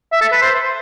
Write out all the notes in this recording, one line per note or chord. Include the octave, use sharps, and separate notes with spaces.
E5
A4
B4
C5